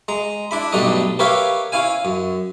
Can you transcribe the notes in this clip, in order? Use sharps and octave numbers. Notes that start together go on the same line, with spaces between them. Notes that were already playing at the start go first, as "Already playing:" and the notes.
G#3 A#5
D4 E4 B5
B1 G2 G3 A3 D#4 D#5
G4 A#4 B4 C#5 E5 F5
C#4 E4 F5 G#5
F#2